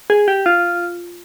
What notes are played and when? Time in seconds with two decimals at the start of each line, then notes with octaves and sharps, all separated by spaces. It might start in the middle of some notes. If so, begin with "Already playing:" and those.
0.10 G#4
0.28 G4
0.46 F4